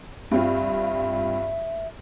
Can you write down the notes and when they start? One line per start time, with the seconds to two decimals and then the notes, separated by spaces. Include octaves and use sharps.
0.31 G2 C4 F4 E5